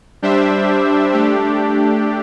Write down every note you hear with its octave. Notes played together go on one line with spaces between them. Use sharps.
G3 D4 G4 C5 E5
A3 D4 G4